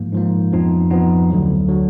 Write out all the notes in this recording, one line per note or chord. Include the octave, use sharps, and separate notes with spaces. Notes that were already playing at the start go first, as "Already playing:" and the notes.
Already playing: G#2 F3 A#3
G#2 F3 A#3
F2 F3 B3 D#4
F2 F3 B3 D#4
D2 D3 F#3
D3 F#3